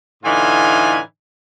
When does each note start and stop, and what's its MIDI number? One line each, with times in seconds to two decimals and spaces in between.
0.24 0.98 45
0.24 0.98 50
0.24 0.98 52
0.24 0.98 63
0.24 0.98 65
0.24 0.98 80